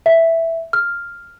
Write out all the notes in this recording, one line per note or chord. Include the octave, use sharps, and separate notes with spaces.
E5
F6